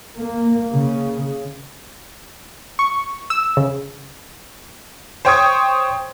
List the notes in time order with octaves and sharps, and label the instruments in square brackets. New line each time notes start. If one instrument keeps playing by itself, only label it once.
[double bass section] A#3
C#3
[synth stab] C#6
E6
C#3
[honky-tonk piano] C5 C#5 G5 C#6 D#6 G#6